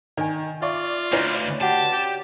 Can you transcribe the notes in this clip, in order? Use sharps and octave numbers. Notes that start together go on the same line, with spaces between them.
D#3 D5 G#5
F4 D5 E5 C#6
D2 C#4 D4 E4 B4 D5 D#5
F#4 G4 F#5 A5
G4